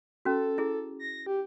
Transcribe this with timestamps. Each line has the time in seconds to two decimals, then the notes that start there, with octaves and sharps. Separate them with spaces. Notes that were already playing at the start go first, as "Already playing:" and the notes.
0.25 C#4 F#4 A4
0.58 E4 G#4
0.99 A#6
1.26 G4